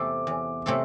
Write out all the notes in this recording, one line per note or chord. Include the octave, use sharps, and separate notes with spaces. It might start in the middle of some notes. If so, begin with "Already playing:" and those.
Already playing: E2 C3 A3 C4 A4 D6
E2
C3 A3 C4 A4